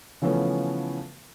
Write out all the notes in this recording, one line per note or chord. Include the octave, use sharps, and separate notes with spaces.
C#3 E3 F3 A3 B3 C#4